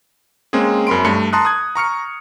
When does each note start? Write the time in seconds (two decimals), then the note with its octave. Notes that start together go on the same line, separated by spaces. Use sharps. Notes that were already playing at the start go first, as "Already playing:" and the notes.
0.53 G#3 A#3 C4 C#4 G#4
0.87 F#2 A#4 B5 C6 D7
1.05 G2 A3 C#7
1.33 A5 A#5 C6 D#6 F#6
1.45 D#6 F#6 G#6
1.75 A#5 C#6 F6 C#7